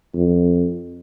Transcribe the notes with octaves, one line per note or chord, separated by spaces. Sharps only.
F2